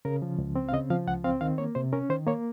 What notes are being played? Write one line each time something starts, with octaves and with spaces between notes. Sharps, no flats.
C#3 A#4
F3
C#2
C4
F5
C#3 D#5
F3 F5
C#2 F#5
C4 F5
D#3 F5
A#3 C#5
C3 C5
C#4 A#4
D#3 C5
A#3 C#5